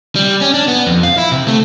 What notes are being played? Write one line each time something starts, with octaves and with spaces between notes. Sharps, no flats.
G3
C#4
D4
B3
F2
F5
E4
C3
A3